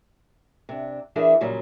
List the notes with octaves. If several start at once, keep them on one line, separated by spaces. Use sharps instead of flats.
C3 D4
E3 D4 E4 G#4 A#4
A#2 C#3 F#3 G3